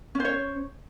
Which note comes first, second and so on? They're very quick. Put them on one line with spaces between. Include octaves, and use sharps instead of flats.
C#4 C5 C#5